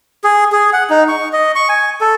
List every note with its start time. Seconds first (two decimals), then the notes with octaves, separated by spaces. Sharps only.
0.24 G#4
0.52 G#4
0.73 F#5
0.90 D#4
1.08 C#6
1.33 D#5
1.56 C#6
1.69 G#5
2.01 A4